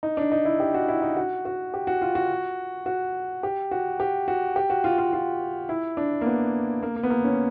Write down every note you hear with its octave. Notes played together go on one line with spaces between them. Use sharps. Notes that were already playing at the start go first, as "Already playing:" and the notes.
D#4
D4
D#4
E4
G4
F#4
E4
D#4
F#4
F#4
G4
F#4
F4
F#4
F#4
G4
F#4
G4
F#4
G4
F#4
F4
F4
F4
E4
D4
A#3
B3
A#3
A#3
B3
A#3
C#4